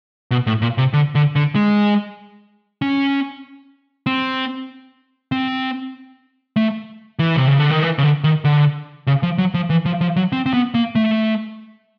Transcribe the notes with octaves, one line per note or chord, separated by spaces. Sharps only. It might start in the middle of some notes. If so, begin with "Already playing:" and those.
B2
A2
A#2
C3
D3
D3
D3
G#3
C#4
C4
C4
A3
E3
C3
C#3
D3
D#3
E3
C#3
D3
D#3
D3
C#3
F3
F#3
F3
E3
F3
F3
F#3
C4
C4
B3
A#3
A3